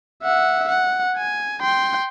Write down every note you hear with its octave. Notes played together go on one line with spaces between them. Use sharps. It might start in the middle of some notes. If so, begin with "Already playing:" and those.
E5 F#5
F#5
G#5
G5 C6